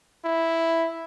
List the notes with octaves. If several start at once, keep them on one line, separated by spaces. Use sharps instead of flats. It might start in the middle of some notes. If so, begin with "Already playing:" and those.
E4